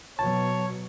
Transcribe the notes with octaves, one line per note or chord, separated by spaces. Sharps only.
B2 F#3 C#5 A5